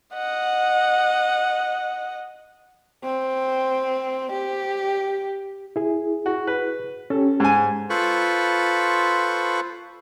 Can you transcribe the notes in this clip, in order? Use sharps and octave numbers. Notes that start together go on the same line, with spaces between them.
D#5 F#5
C4
G4
E4 G#4
F#4
B4
C#4 G4 A4
G#2 G#5
F4 A4 B4 C5 B5 C#6